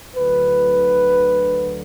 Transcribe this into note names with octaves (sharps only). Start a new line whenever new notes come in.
D2 D3 F#3 B4